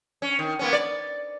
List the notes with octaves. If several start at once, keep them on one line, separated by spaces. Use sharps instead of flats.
C#4
D#3
A#3 B3 C#4
D5